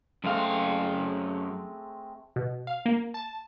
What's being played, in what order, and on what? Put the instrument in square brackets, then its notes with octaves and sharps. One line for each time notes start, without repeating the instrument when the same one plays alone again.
[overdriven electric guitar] F#2 F5 [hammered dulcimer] G#3 A3 C4
[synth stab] B2
F5
A#3
A5